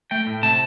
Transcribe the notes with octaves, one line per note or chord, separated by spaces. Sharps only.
A3 G5
A2
C3 A5